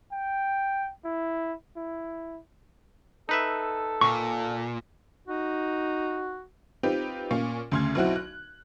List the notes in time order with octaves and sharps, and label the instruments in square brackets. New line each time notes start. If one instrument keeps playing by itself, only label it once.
[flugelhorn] G5
E4
E4
[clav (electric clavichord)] D#4 B4 E5 [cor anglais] A4
[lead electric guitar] A#2 [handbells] C#6
[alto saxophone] D#4 [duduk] F#4
[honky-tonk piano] C4 D#4 F4 G4 B4
A#2 C#4 F5 C#6
D2 C#3 C6 F6 G#6
B1 C4 E4 F#4 F#6
F#6